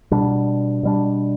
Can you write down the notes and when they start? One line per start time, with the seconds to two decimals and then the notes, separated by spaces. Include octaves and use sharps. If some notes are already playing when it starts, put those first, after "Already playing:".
0.11 B2 G3 D4
0.83 B2 G3 D4